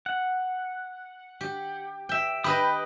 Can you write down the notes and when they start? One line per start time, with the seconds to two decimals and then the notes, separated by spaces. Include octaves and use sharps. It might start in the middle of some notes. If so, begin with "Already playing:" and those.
0.06 F#5
1.41 G4
2.09 E5 G5
2.44 G4 B4 D#5 G5 B5 D#6